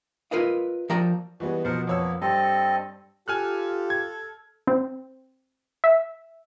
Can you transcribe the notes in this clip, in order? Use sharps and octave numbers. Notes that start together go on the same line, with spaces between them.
F4 A#4 B4 D#5 F5
F3 A#4 D5 G5 A#5
E3 G3 G#3 B3 F#4
B2 F3 A#4 C5 F#5
F2 A#3 B3 C#5 E6
G2 C4 A4 D#5 C6
F4 G4 A4 G#5 F6 F#6
G#6
C4
E5